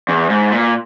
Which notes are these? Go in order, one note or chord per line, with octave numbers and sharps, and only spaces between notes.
E2
G#2
A#2